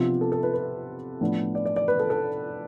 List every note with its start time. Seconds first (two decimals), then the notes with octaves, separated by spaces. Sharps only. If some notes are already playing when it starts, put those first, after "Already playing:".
Already playing: C3 F3 B3 D4 F4
0.21 A4
0.32 A4
0.43 B4
0.54 B4
1.21 A2 F3 B3 D4
1.55 D5
1.65 D5
1.76 D5
1.88 B4
1.99 A4
2.10 A4